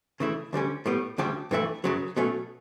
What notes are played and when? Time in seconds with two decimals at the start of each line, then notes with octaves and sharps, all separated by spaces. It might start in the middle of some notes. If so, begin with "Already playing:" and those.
0.20 C#3 E3 A3 E4
0.53 D2 D3 G3 C#4
0.86 A2 G3 B3
1.18 D2 C#3 G3 D4 G4
1.51 G2 E3 A3 E4
1.84 F#2 C#3 F#3
2.17 B2 F#3 A3 C#4